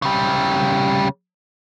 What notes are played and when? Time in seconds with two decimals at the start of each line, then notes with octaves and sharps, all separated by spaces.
0.02 C#3 G3